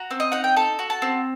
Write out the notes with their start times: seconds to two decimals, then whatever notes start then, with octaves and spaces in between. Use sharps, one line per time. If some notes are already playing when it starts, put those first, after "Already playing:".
Already playing: F#4 A#5
0.11 C4
0.20 D#5
0.32 D#4 F#5
0.44 G5
0.57 A4 A5
0.79 F#4
0.90 A5
1.02 C4